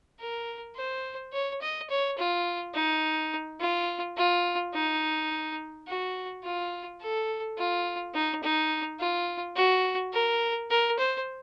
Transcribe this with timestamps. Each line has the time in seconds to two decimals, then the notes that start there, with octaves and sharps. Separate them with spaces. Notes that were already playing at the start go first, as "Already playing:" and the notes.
0.19 A#4
0.76 C5
1.33 C#5
1.61 D#5
1.90 C#5
2.18 F4
2.75 D#4
3.60 F4
4.17 F4
4.74 D#4
5.87 F#4
6.44 F4
7.01 A4
7.57 F4
8.14 D#4
8.43 D#4
8.99 F4
9.56 F#4
10.13 A#4
10.70 A#4
10.99 C5